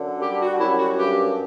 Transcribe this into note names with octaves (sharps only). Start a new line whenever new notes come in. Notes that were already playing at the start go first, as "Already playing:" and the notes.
Already playing: F#2 D3
G3 G4
F#4
F#4
F#2 E4
F#4
G2 G4